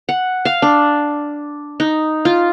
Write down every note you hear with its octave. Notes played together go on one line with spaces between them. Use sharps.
F#5
F5
D4
D#4
F4